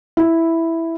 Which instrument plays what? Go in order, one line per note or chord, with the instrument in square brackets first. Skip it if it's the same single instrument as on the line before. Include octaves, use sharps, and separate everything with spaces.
[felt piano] E4